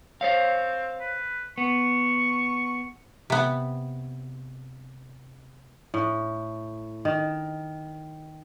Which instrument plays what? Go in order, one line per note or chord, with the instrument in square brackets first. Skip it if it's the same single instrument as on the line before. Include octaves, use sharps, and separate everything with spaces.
[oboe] C4 [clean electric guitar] C5 C#5 F5
[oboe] B4
[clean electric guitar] B3 [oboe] C#6
[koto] C3 B3
[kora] A2
D#3